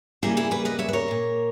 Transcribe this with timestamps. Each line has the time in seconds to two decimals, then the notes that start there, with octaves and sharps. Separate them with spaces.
0.22 E2 C#3 G3 A#3 E4 G#4
0.37 E4 G#4
0.51 G#4 B4
0.65 B4 D#5
0.79 C#5 E5
0.88 B4
0.93 A#4 C#5
1.08 A#2 A#3